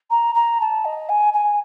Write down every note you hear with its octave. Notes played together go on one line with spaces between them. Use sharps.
A#5
A#5
A5
D#5
G#5
G#5